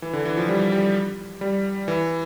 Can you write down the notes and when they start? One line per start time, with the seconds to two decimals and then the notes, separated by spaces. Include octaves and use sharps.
0.02 E3
0.13 D3
0.25 E3
0.37 F3
0.49 G3
0.72 G3
1.41 G3
1.88 E3